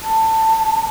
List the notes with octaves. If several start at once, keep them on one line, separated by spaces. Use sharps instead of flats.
A5